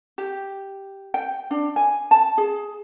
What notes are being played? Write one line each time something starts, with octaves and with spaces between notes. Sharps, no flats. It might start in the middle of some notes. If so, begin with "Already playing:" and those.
G4
G5
D4
G#5
A5
G#4